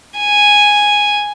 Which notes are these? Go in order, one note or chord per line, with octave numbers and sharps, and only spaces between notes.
G#5